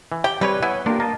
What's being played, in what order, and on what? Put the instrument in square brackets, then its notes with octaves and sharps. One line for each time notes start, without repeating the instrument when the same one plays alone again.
[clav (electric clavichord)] E3
[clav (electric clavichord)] G4 [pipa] G5
[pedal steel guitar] G3 G#5 [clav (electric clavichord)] C4 G4 C#5 [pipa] B4
[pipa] B3 [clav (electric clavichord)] E4 [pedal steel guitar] C#5 F#5 G#5
[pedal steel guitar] A#3 G4 [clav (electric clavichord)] D4 F4
[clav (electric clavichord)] A#3 [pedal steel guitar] D#5 A5 A#5